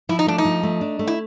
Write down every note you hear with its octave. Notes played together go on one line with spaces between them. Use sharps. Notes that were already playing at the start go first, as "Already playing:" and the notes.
F3 E4
D#4
A3 D4
D#4
F3
A3
D4
A3
E4